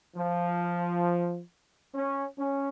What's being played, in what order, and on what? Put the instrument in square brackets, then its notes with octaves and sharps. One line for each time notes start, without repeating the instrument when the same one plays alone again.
[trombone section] F3
C#4
C#4